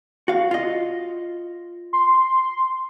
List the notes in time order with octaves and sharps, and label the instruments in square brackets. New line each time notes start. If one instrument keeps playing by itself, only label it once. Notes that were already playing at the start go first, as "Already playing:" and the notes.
[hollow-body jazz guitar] F#4 F5
F4 D#5
[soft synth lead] C6